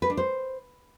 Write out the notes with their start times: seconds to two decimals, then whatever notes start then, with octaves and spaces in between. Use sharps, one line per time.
0.02 B4
0.10 D4
0.17 C5